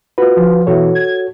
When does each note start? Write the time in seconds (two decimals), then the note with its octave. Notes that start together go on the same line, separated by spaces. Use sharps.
0.18 F4 F#4 B4
0.37 F3
0.67 B2 E3 F#4 A4 C#5
0.95 G#6